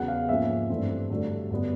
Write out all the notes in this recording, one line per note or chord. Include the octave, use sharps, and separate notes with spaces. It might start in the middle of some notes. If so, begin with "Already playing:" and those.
Already playing: E2 C#3 F#3 B3 F#5
F5
G#2 F3 A#3 C#4 E5
G2 E3 A3 C4
G2 D3 F#3 A3
G2 D3 F#3 B3